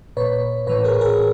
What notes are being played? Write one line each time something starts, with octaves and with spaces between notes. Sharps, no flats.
A#2 B4 C#5
A2 E3 B4 C#5
G#4 A#4
G#4 A#4